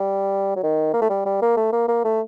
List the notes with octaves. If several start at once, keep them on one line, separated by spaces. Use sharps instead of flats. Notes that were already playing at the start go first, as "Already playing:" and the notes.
Already playing: G3
F#3
D#3
A#3
A3
G3
G3
A#3
A3
A#3
A#3
A3